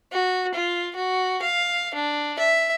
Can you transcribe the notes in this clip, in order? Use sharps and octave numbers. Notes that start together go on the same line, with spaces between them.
F#4
F4
F#4
F5
D4
E5